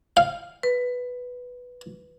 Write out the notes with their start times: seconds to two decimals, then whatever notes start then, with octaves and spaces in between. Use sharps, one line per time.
0.17 F5
0.63 B4